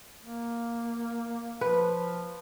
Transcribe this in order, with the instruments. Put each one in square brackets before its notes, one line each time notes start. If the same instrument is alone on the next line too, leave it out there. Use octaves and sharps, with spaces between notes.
[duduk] A#3
[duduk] F3 [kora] B4